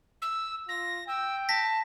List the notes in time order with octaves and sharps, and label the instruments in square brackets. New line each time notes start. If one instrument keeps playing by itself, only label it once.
[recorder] E6
[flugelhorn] F4 [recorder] A#6
[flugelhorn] G5 [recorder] E6
[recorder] A5 [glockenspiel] A#6 B6